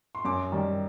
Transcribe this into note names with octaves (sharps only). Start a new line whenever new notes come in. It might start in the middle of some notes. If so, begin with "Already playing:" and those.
C6
F#2 D6
D#3 G3